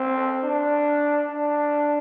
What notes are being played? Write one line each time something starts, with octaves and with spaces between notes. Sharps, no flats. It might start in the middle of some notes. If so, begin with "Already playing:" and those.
Already playing: C4
D4
D4